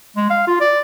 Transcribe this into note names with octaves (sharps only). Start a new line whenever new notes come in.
G#3
F5
F4
D5